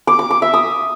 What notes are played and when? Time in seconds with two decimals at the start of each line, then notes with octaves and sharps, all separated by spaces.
0.07 D6
0.19 D6
0.30 D6
0.42 E5
0.54 D#6